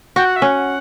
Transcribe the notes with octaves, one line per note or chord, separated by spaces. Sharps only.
F#4 G5
F#5
E5
C#4 F#5